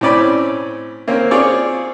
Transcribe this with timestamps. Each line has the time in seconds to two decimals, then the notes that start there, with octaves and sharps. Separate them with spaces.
0.01 A2 C4 C#4 D5 B5
1.08 A#3 C4 C#4
1.31 C4 F4 G#4 C#5 D5